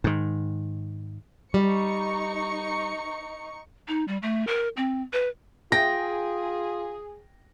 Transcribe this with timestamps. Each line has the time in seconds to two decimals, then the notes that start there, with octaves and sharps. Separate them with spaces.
0.04 G#2 D#3
1.54 G3 D#4 C#6 C#7
3.88 D#4
4.08 G3
4.22 A3
4.47 A#4
4.77 C4
5.13 B4
5.72 F4 G#4 G5 A#6